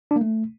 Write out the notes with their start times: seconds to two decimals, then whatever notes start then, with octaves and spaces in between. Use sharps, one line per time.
0.11 D4
0.16 A#3
0.21 A3